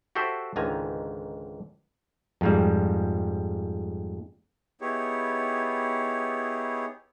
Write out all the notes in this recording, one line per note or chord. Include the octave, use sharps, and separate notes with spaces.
F#4 G4 A4 C5 E5
C#2 G#2 D3 D#3 G#5 A#5
F2 G#2 G3
B3 D#4 E4 G4 G#4 C#5